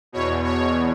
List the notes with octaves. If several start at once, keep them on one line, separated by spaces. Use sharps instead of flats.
E2 B2 C#5
C#5